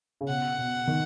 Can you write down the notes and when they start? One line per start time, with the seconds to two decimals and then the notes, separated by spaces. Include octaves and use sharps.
0.21 C#3
0.28 B2 F#5
0.58 B2
0.87 D#3